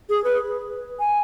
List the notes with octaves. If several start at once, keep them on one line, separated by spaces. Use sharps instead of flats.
G#4
B4
G#5